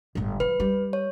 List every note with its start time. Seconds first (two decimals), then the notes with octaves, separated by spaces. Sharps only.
0.15 G1 A2
0.40 F3 B4
0.60 G3
0.93 C#5